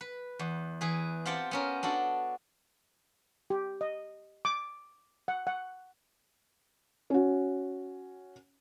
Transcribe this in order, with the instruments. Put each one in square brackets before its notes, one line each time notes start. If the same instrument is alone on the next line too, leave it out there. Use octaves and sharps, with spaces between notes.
[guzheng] B4
E2
E3 G#4 B4
C4 F4 G4 F#5 G5 A5
B3 C#4 A#4
D4 F#4 A4
[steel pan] G4
D#5
D6
F#5
F#5
[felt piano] C#4 F#4